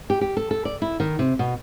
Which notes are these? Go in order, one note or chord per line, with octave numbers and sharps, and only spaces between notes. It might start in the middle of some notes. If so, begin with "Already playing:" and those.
G4
G4
A4
A4
D5
E4
D#3
C3
B2